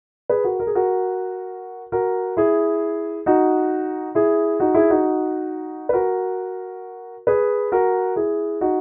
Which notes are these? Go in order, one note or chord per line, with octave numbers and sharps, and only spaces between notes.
G#4 B4
F#4 A#4
A#4
G#4
F#4 A#4
F#4 A#4
E4 G#4
D#4 F#4
E4 G#4
D#4 F#4
E4 G#4
D#4 F#4
B4
F#4 A#4
G#4 B4
F#4 A#4
E4 G#4
D#4 F#4